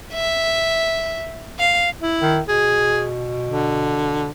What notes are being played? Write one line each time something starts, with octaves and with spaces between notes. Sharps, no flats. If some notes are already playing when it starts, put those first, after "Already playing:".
E5
F5
E4
D#3
B2 G#4
D3